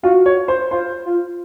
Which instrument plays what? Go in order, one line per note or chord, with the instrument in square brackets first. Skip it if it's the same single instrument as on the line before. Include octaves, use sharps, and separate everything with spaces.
[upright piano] F4 [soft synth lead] F#4
[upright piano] C#5
C5
[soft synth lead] F4 [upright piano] C5
[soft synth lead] F4